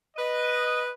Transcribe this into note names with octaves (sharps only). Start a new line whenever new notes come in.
B4 D#5